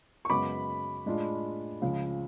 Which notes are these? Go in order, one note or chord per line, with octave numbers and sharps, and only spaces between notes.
C#6
F#2 C#3 G#3 B3 B5 D6
A2 G#3 D4 F4
C#2 C#3 F3